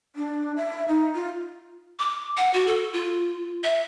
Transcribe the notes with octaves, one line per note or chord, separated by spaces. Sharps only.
D4
E5
D#4
F4
D6
F#5
F#4
A4
F4
E5